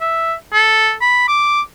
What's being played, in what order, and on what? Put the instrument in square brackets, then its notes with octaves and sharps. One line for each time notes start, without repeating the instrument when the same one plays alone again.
[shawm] E5
A4
B5
D6